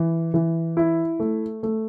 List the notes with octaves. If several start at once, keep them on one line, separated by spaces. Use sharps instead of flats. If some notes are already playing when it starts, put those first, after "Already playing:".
Already playing: E3
E3
E4
A3
A3